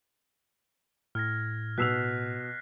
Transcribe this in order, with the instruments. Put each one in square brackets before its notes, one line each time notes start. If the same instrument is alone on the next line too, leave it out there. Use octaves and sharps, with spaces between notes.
[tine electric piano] A2 [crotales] F6 G#6 A#6
[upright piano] B2 E6 F7 [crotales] F#6 B6 C7